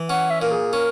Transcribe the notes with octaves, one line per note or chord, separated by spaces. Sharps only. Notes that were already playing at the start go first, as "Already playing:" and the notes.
Already playing: E3
C#4 F#5
E5
A#2 A#4
G#4
C#4 A#4